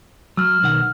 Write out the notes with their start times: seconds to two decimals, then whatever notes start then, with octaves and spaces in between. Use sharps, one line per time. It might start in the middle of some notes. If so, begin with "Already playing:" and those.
0.37 F#3 E6 F6
0.63 B1 D#3 F#5